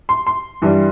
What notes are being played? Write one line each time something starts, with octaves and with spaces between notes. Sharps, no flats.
C6
C6
G2 E3 G3